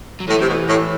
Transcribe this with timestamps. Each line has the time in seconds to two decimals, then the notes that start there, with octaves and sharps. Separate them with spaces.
0.20 F#3
0.28 A2 E3
0.41 C3
0.49 B2
0.69 A2